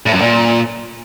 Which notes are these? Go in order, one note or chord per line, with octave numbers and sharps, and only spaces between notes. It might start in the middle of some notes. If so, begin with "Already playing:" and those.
A2
F#2
A#2